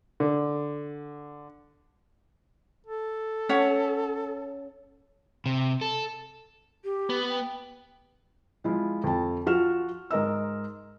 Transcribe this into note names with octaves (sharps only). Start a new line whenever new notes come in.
D3
A4
C#4 C#5 F#5
C3
A4
G4
B3
G5
F3 G#3 E4 F4
F2 A5
F3 F4 F#4 F6 E7
G#2 A#4 D#5 E6